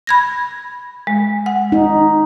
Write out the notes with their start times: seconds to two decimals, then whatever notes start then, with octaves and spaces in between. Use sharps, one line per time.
0.07 B5 G#6 A#6
1.07 G#3
1.46 F#5
1.72 D#4